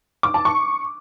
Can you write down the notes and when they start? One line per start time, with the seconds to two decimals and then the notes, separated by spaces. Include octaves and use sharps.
0.23 D6
0.34 A5
0.45 C#6